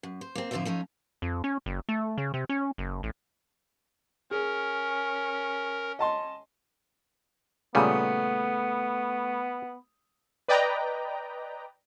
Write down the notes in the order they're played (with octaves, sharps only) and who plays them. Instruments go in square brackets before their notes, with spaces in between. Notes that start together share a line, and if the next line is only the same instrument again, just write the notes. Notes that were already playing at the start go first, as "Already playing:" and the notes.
[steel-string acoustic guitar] F#2
C5
A#3 C4
F2 A2 D3 D#4 C5 E5
F3 A3 C#4 D#4
[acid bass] F2
C#4
F#1
A3
C#3
C3
C#4
F#1
A1
[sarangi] C#4 [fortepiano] G#4 [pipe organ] A#4
[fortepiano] D#5 A5 C6
[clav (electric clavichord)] A#2 C#3 G3 [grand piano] A3 D#6 [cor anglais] B3
[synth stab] B4 D5 D#5 G5 A#5